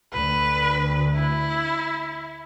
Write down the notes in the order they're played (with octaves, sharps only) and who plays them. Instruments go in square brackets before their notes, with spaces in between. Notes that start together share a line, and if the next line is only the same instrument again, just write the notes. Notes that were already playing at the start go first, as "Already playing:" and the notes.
[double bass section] D2 [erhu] B4
[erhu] E4